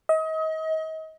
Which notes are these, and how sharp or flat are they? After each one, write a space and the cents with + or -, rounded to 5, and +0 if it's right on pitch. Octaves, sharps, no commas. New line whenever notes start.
D#5 +35